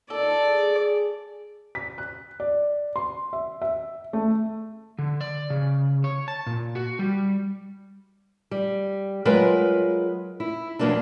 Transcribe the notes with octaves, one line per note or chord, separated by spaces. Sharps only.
A#2 D#4 A4 D5
G#4
B6
F#6
D5
C6
E5
E5
A3
D3
D5
C#3
C#5
A5
A#2
F#4
G3
G3
F#3 G#3 F4 A#4 B4
E4
E2 B2 F#3 A#3 C4 D4